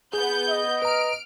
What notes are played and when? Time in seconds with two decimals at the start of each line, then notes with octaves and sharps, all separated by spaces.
0.13 B3 G#4 G6
0.49 D#5
0.82 B4 A#5 F6 D7